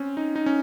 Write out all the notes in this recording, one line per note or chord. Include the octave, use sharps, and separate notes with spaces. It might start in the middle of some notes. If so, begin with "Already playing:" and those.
Already playing: C4 C#4
D#4
D#4
C#4